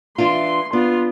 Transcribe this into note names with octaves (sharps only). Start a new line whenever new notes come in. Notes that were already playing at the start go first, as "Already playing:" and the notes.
E3 D4 F4 C6
B3 D4 F4